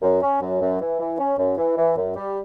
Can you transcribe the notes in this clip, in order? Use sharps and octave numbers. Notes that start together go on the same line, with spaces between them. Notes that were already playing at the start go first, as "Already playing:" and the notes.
F#2
C#4
F#2
F#2
E3
E3
C#4
F#2
E3
E3
F#2
G3